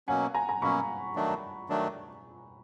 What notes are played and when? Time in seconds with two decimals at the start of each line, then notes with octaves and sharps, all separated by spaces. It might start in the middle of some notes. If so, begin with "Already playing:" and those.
0.08 B2 F#3 A#3 C#4 F#5 G#5
0.34 G#5 A#5
0.48 G#5 A#5
0.62 B2 F#3 A#3 C#4 B5 C#6
1.16 D#3 F#3 A3 D4
1.69 D#3 F#3 A3 D4